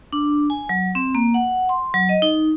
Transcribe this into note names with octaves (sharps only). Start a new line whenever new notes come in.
D4
G#5
F#3
C4
A#3
F#5
C6
F#3
D#5
D#4